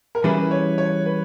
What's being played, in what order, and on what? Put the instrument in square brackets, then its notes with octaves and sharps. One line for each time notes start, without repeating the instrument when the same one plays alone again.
[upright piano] A#4
[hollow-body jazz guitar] E3 G3 C#4 E4 G#4 [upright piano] B4
[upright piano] C#5
C#5
B4